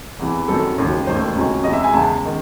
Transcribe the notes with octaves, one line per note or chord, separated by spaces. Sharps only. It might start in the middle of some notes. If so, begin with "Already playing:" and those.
E2 C3 E3
F#2 D#3 F#3 C4 A4
E1 D#2 C#3 F#3
E1 D#2 D#3 A3 C5
C#2 C3 F#3 C#4
E2 C3 E3 G#3 D#5
E5
G#5
E2 C#3 G#3 A5
D#3